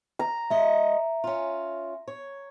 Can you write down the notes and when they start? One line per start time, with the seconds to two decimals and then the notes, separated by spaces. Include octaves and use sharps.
0.19 A#5
0.50 G#3 D#5 E5
1.24 C#4 F4
2.08 C#5